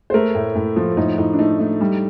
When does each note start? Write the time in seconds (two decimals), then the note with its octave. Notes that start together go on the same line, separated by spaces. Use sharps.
0.10 C5
0.14 A3 A#4
0.35 A2
0.55 A2
0.76 F3
0.97 A2 D#4
1.18 A2 D#4
1.33 D4
1.39 A3 D#4
1.59 A3
1.81 G3